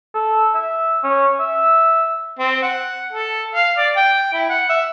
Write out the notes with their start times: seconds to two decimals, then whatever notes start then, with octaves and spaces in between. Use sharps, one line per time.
0.15 A4
0.54 E5
1.04 C#4
1.40 E5
2.39 C4
2.63 F#5
3.13 A4
3.55 F5
3.78 D5
3.96 G5
4.34 E4
4.50 F#5
4.70 E5